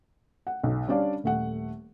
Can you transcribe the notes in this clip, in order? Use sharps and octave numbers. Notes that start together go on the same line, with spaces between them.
F#5
B1
G3 C#4 D4 D5 F5
D#1 A3 F#5